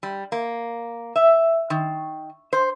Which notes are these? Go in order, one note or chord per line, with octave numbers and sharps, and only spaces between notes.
G3
A#3
E5
D#3
C5